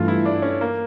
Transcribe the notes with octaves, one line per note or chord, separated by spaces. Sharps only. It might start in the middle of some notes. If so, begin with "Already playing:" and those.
Already playing: G2 E3 A3 F4
E4
D4
C#4
A#3